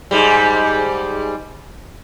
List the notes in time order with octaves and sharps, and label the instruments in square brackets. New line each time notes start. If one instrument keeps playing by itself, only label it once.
[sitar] G#2 G3